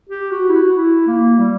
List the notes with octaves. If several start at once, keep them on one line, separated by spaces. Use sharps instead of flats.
G4
F#4
E4
F#4
E4
A#3
G3